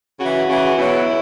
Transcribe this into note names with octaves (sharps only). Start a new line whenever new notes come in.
C#3 E3 F#4
C#3 E3
B2 F#3 E4